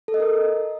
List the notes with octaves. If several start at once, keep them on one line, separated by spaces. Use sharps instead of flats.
A4
D#5
A#4